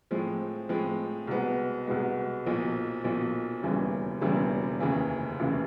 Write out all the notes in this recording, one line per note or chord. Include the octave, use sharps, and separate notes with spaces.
A2 F3 G#3 C4
A2 F3 G#3 C4
C2 B2 G#3 B3
C2 B2 G#3 B3
B1 A#2 F3
B1 A#2 F3
E1 D#2 C#3 E3 G3
E1 D#2 C#3 E3 G3
F1 D#2 C#3 E3
F1 D#2 C#3 E3